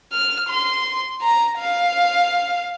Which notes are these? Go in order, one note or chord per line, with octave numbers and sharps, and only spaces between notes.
F6
C6
A#5
F5